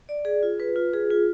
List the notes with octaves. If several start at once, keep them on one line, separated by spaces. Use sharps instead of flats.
D5
G#4
F4
B4
F4
G#4
F4